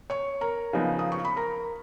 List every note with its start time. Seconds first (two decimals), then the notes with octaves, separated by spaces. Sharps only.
0.10 C#5 C#6
0.41 A#4 A#5
0.73 C#3 F3 B3 D#4
0.99 D#6
1.12 C#6
1.25 B5
1.36 A#4 A#5